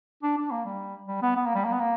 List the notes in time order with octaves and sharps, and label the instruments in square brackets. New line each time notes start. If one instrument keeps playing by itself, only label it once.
[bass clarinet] D4
D4
A#3
G3
G3
B3
B3
A#3
G3
A#3
B3
A#3